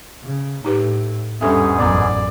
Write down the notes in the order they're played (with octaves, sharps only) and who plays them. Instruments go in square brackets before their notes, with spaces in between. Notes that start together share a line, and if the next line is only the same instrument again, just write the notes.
[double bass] C#3
[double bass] A2 [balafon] D#4 G4 B4
[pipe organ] E2 G#2 G#4 [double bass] G3 C#4 [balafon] D4 A4 E5
[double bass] A1 F#2 [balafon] B3 A#5 [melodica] D5